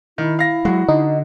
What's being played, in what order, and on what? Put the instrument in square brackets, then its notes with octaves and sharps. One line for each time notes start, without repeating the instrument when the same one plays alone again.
[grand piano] D#3 [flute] E4
[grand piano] F5 A#6
[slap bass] F#3 G#3 [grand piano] F#4
[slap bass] D3 [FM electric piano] D#4